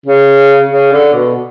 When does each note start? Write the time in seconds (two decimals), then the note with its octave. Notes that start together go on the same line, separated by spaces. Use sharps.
0.06 C#3
0.71 C#3
0.92 D3
1.14 B2